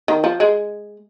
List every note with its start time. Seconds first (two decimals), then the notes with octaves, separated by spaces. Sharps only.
0.08 D#3
0.24 F3
0.40 G#3